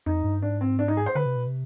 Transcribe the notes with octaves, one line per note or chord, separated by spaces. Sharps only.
F2 D#4
G2
G#2 D4
C4
D4
D#4
G#4
C5
D3 B4
C3
B2
C3